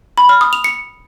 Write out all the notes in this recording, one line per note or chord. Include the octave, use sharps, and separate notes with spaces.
B5
F6
D#6
F7
C#7